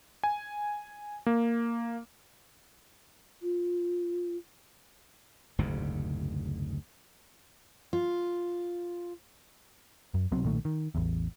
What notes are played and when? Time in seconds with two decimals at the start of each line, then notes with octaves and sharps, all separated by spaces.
0.23 G#5
1.26 A#3
3.42 F4
5.59 F#1 D2 G#2 C3
7.93 F4
10.14 F#2
10.32 C2 B2 F#3 C4
10.44 B1 A#2 D#3 A3
10.65 D#3
10.95 A1 E2